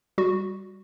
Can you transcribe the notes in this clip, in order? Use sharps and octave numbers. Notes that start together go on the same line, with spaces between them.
G3 F#4